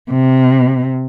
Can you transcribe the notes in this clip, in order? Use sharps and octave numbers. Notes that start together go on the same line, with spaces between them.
C3